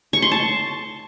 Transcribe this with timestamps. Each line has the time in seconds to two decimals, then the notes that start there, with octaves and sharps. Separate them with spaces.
0.13 C#6
0.22 C6
0.32 A5